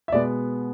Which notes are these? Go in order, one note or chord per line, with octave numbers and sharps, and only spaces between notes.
E5
B2 G#3 B3 D5